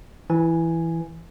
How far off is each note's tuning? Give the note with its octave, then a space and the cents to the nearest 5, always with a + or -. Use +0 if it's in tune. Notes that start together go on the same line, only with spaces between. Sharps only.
E3 +0 G#5 +0